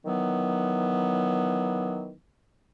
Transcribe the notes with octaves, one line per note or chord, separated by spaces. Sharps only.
D#3 E3 F#3 B3